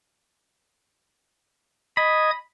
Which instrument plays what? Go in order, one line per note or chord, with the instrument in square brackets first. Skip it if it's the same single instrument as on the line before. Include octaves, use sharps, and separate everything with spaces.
[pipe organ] D#5 D#6 G#6 [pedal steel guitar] B5